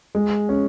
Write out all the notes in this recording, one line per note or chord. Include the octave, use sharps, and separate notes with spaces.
G#3
C#4